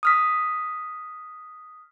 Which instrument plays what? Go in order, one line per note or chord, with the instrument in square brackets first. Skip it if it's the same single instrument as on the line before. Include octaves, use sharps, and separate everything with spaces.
[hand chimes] D#6 F6 B6